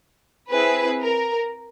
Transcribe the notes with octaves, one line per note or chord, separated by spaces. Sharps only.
C4 E4 G#4 B4
A#4